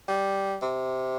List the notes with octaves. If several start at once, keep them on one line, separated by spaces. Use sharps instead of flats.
G3
C3